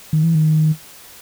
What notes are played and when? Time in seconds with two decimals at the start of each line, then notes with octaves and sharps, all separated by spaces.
0.13 D#3
0.24 E3
0.35 D#3